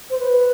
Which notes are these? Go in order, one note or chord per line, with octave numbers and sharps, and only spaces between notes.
C5
B4